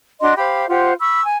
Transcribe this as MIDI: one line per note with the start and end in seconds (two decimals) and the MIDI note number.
0.21 0.34 62
0.21 0.34 66
0.21 0.34 75
0.21 0.34 84
0.37 0.66 67
0.37 0.66 72
0.37 0.66 77
0.37 0.66 83
0.68 0.93 65
0.68 0.93 67
0.68 0.93 72
0.68 0.93 78
1.00 1.21 83
1.00 1.21 85
1.00 1.21 88
1.24 1.36 80